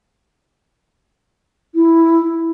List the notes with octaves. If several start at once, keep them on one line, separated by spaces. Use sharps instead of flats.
E4